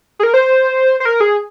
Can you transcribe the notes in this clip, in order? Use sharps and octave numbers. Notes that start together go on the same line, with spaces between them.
G#4
A#4
C5
C5
A#4
G#4